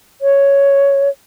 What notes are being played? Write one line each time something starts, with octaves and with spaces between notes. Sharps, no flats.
C#5